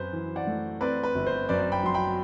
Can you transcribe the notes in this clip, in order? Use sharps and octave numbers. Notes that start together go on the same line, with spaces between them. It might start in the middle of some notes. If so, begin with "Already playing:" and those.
Already playing: F#2 C4 B4 C5
E3
D5 F#5
A3
C4 B4 D5
B4
G1
C5
F#2 B4 D5
G5 B5
F#3 C6
G5 B5